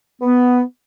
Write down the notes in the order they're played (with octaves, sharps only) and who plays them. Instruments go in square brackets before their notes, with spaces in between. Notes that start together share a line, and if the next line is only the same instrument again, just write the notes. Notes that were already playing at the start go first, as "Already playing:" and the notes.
[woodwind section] B3